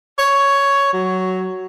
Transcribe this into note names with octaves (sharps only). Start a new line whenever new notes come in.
C#5
F#3